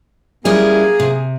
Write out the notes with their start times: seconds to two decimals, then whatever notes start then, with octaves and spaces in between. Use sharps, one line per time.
0.45 G3 A#3 C#4 E4 G#4
1.00 C3